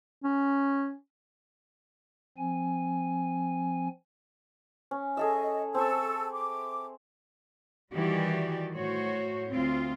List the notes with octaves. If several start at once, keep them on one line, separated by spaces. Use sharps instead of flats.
C#4
F3 C4 G#5
C#4
G#4 A4 D#5 E5
C4 A4 A5 C#6 E6
D6
D#3 E3 G3 F#4 G4 D5
A2 F#4 C5 C#5
D2 C4 F4